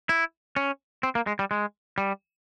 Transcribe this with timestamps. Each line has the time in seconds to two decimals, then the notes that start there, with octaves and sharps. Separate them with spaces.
0.09 E4
0.56 C#4
1.03 C4
1.15 A#3
1.27 G#3
1.39 G3
1.51 G#3
1.98 G3